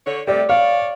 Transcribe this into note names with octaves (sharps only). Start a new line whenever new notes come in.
D3 C#5
C3 G3 A3 D5
C#5 D5 F5